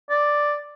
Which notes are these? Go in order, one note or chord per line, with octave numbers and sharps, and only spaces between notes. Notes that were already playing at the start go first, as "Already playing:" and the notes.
D5